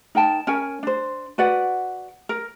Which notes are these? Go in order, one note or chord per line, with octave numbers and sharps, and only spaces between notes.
D#4 A#4 G5 A5
C#4 A#4 G#5
D4 C5
F#4 B4 D5 F#5
A#4